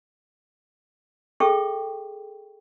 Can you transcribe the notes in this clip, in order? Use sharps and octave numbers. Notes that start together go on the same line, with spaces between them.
G#4 A4 E5 G5 C#6